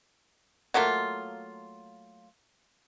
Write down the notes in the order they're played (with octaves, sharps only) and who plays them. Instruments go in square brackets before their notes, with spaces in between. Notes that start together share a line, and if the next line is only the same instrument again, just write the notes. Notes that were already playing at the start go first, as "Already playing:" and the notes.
[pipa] F#3 A3 A#3 F4